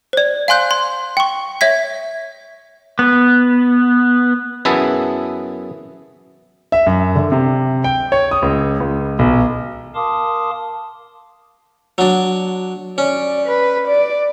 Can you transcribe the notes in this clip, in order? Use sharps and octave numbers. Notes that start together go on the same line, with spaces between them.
C5 D5
F5 G#5 C6 F#6 G6
C6
G5 C#6
C#5 E5 G#6 B6
B3
F#2 B3 E4 G#4 E5 A5
E5
F#2
D3
C3
G5
C#5
D#6
C#2
C#2
B1
A#4 F5 A5 C6 D6 D#6
F#3 D4
C#4 D5
B4
D5